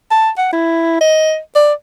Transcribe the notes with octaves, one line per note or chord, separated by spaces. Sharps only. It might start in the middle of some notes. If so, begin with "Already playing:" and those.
A5
F#5
E4
D#5
D5